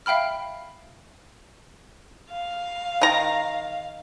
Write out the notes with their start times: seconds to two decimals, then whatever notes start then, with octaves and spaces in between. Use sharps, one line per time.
0.06 E5 F5 G5 B5 F6
2.31 F5
3.01 D#3 A#5